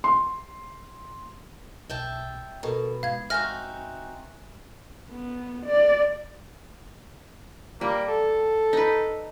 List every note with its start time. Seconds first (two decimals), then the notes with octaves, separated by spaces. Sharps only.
0.04 C6
1.90 B1 E5 G5 A5
2.63 B2 A4 A#4
3.03 G#2 F5 G#6
3.30 C4 D#4 F#4 E5 G#5 F6 F#6 A#6
5.10 B3
5.66 D5
7.81 G3 A#3
8.08 A4
8.73 D#4 B4